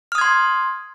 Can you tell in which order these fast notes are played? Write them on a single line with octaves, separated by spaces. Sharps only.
F6 D#6 G#6 C6